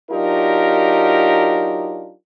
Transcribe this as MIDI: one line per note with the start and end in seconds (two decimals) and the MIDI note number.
0.10 2.12 54
0.10 2.12 62
0.10 2.12 63
0.10 2.12 65
0.10 2.12 67
0.10 2.12 70